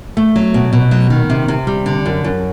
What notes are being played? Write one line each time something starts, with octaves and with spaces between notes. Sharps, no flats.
A3
F#3
B2
B2
F#3
D#3
C3
C3
G3
D3
F#2
F#2